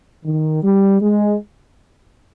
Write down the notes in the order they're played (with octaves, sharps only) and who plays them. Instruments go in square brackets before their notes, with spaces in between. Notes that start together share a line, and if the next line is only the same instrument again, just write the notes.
[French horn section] D#3
G3
G#3